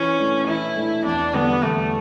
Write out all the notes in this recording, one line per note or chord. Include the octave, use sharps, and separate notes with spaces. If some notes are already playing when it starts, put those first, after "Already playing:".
Already playing: E3 C#4
A3 D4
E3 E4
A3 D4
E2 D4
D3 G3 B3
E2 A3